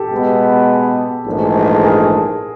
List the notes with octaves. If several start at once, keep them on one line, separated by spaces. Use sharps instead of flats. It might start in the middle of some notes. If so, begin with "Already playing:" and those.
Already playing: G4 A4
B2 G#3 B3
A#1 G#2 E3 A3
G#4 A#4